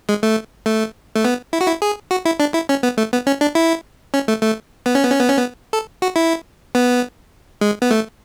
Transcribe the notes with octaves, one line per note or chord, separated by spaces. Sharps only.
G#3
A3
A3
A3
B3
E4
F#4
E4
G#4
F#4
E4
D4
E4
C#4
B3
A3
B3
C#4
D4
E4
C#4
A3
A3
B3
C#4
B3
C#4
B3
C#4
B3
A4
F#4
E4
B3
G#3
B3
A3